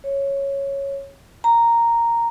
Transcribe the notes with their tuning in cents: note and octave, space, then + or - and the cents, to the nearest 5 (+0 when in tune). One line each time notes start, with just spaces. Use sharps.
C#5 -5
A#5 -5